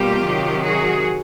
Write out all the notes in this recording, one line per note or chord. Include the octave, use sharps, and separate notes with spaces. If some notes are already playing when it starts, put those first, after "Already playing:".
Already playing: B2 G3 A#3 F4 G4
C3 D#3 F#3
F#4 G#4